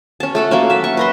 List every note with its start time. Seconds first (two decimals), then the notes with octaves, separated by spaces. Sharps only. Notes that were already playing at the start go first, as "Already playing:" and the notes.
0.20 C#4 A5
0.35 A3 A4 F#5
0.51 F#3 A#3 C#4
0.70 E5 A5
0.84 C#6
0.97 B4 A#5 C6